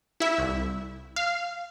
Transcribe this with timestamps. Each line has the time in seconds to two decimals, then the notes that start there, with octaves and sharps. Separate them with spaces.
0.20 E4 E5
0.38 C2
1.16 F5